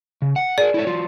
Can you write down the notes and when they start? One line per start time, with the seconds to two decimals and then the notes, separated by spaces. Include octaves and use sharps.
0.22 C#3
0.36 F#5
0.58 G#4 A#4 D5
0.74 E4 A4 C#5
0.87 F#3 F4